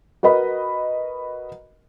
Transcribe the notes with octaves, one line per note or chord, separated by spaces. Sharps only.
F#4 A#4 B4 D#5 B5